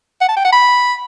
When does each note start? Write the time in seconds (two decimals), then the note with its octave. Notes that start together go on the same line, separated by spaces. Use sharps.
0.21 F#5
0.29 A5
0.37 G5
0.45 F#5
0.52 B5